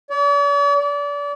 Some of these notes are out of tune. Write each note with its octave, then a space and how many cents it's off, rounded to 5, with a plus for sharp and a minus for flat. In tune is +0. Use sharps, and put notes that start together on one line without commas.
D5 -45
D5 -35